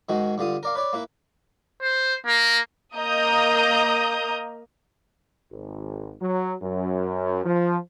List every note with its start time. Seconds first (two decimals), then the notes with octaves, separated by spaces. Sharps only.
0.09 G#2 D#3 G#3 F#4
0.38 G2 D3 F4 D#6
0.63 A#4 D5 F5
0.75 B4 C#5 D5
0.93 A#3 E4 B4
1.82 C5
2.26 A#3
2.95 A#3 D#5 A#5 D#6 G6
5.51 G#1
6.21 F#3
6.63 F#2
7.45 F3